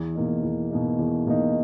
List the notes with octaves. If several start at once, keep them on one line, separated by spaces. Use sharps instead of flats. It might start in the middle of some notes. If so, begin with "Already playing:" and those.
Already playing: E2
B2 A#3 D#4
E2
B2 A#3 D#4
E2
B2 A#3 D#4